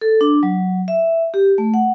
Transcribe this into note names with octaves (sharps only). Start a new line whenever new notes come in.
A4
D4
F#3
E5
G4
A3
F#5